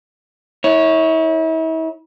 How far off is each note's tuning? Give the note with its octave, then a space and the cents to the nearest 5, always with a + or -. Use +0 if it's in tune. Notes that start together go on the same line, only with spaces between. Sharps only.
E4 -40 C#5 +0